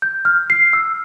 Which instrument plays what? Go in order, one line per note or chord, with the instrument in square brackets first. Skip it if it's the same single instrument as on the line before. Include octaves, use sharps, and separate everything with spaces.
[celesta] G6
F6
C7
E6